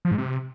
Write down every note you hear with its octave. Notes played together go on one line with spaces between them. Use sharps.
F3
G#2
C3